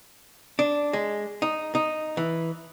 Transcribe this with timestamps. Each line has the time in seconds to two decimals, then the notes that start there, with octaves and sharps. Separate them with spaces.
0.59 D4
0.93 G#3
1.42 D#4
1.75 D#4
2.17 E3